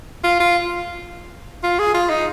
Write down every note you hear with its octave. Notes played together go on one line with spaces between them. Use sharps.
F4
F4
F4
G#4
F4
D#4